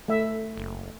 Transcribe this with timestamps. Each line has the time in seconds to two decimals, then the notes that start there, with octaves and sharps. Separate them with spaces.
0.08 A3 E5
0.57 F#1